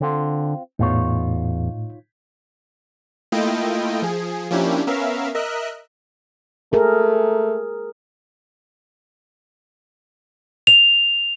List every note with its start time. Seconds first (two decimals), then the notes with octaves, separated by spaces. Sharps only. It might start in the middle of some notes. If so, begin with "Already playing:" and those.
0.01 D3 C4 F4
0.79 E2 A2 D#4 F4 C#5
3.32 A3 A#3 E4 F4 D#5 G5
4.02 F3 G#4
4.51 F3 A#3 C#4 D4 E4 G4
4.87 B3 C#4 A#4 E5 F5
5.35 A#4 D#5 E5 F#6
6.73 A3 G#4 A#4
10.67 F7